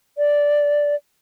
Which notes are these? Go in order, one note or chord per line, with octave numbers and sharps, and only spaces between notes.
D5